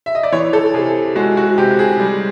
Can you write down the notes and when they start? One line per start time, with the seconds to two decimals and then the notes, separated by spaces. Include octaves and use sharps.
0.06 E5
0.15 D#5
0.23 D5
0.32 E3 C#5
0.53 A4
0.74 C3 G#4
1.16 G#3 F#4
1.37 F#4
1.58 C3 G4
1.79 G#4
1.99 G3